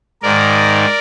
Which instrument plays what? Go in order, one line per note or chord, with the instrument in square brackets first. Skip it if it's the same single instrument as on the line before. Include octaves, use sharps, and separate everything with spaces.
[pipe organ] G#2 D#3 A#4 D5